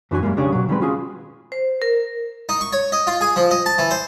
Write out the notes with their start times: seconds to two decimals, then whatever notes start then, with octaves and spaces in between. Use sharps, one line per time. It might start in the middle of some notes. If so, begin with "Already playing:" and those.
0.11 F#2 E3 D4 F#4 C#5 G#5
0.23 F#2 A#2 G3 G#3 A#3
0.37 B1 C#3 D4 G4 G#4 C#5
0.52 B2 F#3
0.69 D#3 G3 G#3 C4 G4 B4
0.81 C#4 F4 F#4 G#4 G#5
1.52 C5
1.82 A#4
2.49 D#4
2.61 C#6
2.73 C#5
2.92 D#5
3.07 F4
3.21 G#4
3.36 F3
3.51 D#5
3.66 A5
3.78 E3
3.91 C5